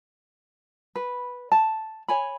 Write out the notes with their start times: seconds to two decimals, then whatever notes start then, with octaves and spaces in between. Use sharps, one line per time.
0.96 B4
1.52 A5
2.08 C#5 G#5 B5